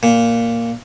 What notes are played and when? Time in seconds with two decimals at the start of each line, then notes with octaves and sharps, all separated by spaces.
0.03 A#2